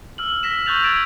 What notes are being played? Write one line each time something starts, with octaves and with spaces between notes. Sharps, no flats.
E6 F6 F#7
E6 A#6 B6 E7
C#6 E6 F#6 G6 A6 F7
E6 G#6 A6 D7 E7